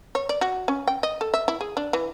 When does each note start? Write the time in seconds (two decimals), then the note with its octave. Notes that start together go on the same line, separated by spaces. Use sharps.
0.15 C#5
0.29 D5
0.41 F#4
0.68 C#4
0.87 G5
1.03 D#5
1.21 A4
1.34 E5
1.48 E4
1.61 G#4
1.77 D4
1.93 E3